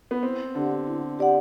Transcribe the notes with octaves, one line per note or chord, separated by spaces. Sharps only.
B3
C4 E4
D3 G4 D5 F#5
E4
G4 D5 F#5